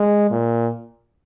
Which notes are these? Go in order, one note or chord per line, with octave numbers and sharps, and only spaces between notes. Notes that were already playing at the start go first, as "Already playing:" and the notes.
Already playing: G#3
A#2